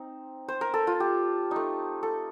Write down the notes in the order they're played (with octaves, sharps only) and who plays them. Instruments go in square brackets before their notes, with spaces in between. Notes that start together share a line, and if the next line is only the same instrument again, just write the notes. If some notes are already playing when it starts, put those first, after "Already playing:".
Already playing: [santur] C4 D#4
C5
A#4
A4
F4
G4
A3 D#4
A4